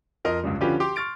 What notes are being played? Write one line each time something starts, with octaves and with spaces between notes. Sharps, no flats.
F2 A#4 D#5 C6
C#2 G2 C#3 G3
D3 F3 C#4 F4 G4 B4
G4 C6 D6
C6 C#6 F6 A6 D7